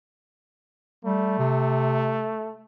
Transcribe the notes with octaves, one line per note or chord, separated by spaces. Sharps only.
G3 A3
C3